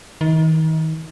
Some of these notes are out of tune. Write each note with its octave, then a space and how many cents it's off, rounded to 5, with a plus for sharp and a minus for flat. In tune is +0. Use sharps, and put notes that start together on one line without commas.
D#3 +35